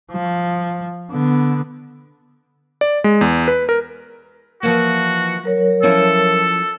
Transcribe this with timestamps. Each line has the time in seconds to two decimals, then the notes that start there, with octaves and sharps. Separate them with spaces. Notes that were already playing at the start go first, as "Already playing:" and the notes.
0.12 F3
1.11 D3 B3
2.81 D5
3.04 G#3
3.21 E2
3.48 B4
3.69 A#4
4.63 E3 F3 A#3 F#4
5.44 F#3 A#4 C#5
5.83 F3 C#4 E4 A4